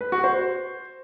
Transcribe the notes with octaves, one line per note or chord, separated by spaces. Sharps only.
B4
F#4
C5